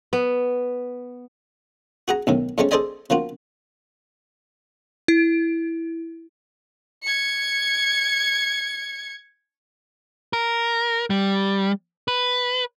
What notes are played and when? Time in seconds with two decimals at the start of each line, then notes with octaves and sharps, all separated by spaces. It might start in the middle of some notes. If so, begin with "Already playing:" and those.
0.13 B3
2.08 F#4 G#4 F#5 A#5
2.27 B1 A2 D#3
2.58 A2 G#3 A3 C4 C#4 C#6
2.71 G#4 A4 C5 D5 D#5 G#5
3.10 F3 A#3 F4 F#4
5.08 E4
7.03 G#6 C#7
10.33 A#4
11.10 G3
12.08 B4